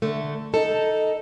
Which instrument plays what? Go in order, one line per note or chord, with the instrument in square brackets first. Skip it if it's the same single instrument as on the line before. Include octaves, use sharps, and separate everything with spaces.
[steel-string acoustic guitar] D3 A3
[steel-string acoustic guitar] D#4 A4 [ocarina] D#5